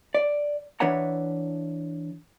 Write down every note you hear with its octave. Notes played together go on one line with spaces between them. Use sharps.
D5
E3 D4 B4 C#5 F#5 A#5